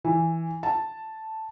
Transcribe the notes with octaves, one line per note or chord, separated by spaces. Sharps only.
E3
A5